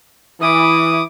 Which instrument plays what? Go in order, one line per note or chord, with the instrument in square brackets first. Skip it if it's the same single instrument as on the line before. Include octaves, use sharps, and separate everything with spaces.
[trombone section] E3 [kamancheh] E4 D6 [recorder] D#6